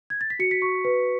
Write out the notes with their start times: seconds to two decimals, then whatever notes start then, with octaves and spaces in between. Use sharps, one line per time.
0.10 G#6
0.21 A6
0.30 B6
0.39 F#4 C#7
0.51 B6
0.62 F#4 C#6
0.85 B4